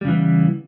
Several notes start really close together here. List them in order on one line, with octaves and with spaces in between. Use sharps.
G3 C#3 E3 B3